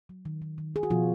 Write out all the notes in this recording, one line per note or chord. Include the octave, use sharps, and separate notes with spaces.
F#3
D#3
D#3
D#3
D#3 G#4
F#4
B2 F3 F4